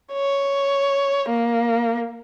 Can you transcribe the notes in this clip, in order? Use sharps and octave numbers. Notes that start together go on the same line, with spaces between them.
C#5
A#3